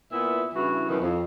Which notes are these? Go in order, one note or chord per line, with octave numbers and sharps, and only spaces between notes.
A#2 B3 E4 B4 E5
G2 C#3 E3 E4 F#4
F#2 B2 D#3 E3
F2